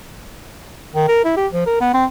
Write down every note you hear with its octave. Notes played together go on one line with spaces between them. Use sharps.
D#3
A#4
E4
G4
F3
A#4
B3
C4